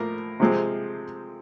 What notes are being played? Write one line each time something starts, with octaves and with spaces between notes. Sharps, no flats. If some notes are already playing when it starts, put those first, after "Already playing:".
Already playing: A2 F3 A#3 A#4
C3 F3 G#3 C4